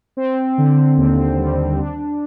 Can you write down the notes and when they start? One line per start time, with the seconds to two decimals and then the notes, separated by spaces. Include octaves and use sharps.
0.17 C4
0.58 D3
0.97 D#2
1.38 G3
1.78 D4